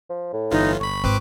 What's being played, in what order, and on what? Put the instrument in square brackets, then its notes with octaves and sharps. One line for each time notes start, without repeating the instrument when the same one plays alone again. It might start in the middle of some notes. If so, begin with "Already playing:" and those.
[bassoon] F3
A2
[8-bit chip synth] G1 E3 F4 [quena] D#4
[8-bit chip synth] G1 B5 [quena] C#6
[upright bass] G#1 F4 [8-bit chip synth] C4 B4 D6